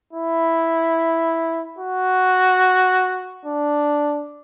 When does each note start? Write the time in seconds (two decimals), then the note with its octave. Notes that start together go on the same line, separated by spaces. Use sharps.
0.13 E4
1.78 F#4
3.45 D4